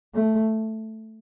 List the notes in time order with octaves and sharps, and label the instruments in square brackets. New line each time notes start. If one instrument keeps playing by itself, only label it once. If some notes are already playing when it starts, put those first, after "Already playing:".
[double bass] A3